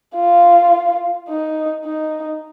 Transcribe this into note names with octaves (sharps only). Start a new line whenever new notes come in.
F4
D#4
D#4